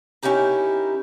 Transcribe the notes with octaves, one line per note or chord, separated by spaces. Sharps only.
C#4 D#4 E4 G4 A#4